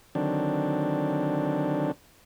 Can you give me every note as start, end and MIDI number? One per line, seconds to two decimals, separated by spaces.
0.15 1.91 50
0.15 1.91 51
0.15 1.91 54
0.15 1.91 60
0.15 1.91 62